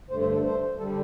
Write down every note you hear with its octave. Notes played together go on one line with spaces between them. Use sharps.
G2 D3 A3 C5
C5
A4
C5
D3 G3 A4